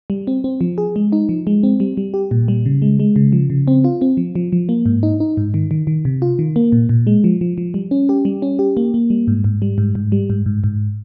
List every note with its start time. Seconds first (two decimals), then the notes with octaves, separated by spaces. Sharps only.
0.10 G3
0.27 C4
0.44 C4
0.61 F3
0.78 G#4
0.96 G#3
1.12 D#4
1.29 F3
1.47 G#3
1.63 C4
1.80 G3
1.97 G3
2.14 G4
2.31 A#2
2.48 G3
2.66 C#3
2.82 G#3
3.00 G#3
3.16 C#3
3.32 F3
3.50 C#3
3.68 C4
3.84 F4
4.01 C4
4.17 F3
4.35 F3
4.52 F3
4.69 A#3
4.86 G#2
5.03 D#4
5.20 D#4
5.37 G#2
5.54 D#3
5.71 D#3
5.87 D#3
6.05 C3
6.22 F4
6.39 D#3
6.56 A#3
6.72 A#2
6.89 A#2
7.07 G#3
7.24 F3
7.41 F3
7.58 F3
7.74 G3
7.91 C#4
8.09 G4
8.25 G3
8.42 C#4
8.59 G4
8.77 A#3
8.94 A#3
9.10 G3
9.28 G#2
9.44 G#2
9.62 G3
9.78 G#2
9.95 G#2
10.12 G3
10.30 G#2
10.46 G#2
10.64 G#2